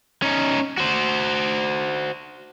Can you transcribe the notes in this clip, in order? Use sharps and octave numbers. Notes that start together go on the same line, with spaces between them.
C#4 D#4
F#4 C5